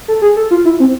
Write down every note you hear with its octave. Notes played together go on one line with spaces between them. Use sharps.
A4
G#4
A4
F4
E4
C4